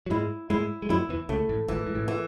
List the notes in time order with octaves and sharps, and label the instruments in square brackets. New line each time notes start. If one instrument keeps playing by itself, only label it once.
[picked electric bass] F#3
[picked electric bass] G#2 G#3 [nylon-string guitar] E4
[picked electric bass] G#2 G#3 [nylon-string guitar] E4
[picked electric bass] G#3
[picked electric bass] F#2 F#3 [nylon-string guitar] E4
[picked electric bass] E2 E3
[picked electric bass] C#2 C#3 [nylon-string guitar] A3
[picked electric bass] A1 A2
[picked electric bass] G#1 G#2 [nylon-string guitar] E3
[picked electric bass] G#2
A1 A2
[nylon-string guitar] E3